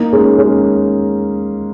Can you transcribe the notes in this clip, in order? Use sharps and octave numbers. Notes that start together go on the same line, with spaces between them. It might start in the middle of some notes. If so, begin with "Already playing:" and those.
Already playing: A#3 D#4
G#3 C#4
G#3 C#4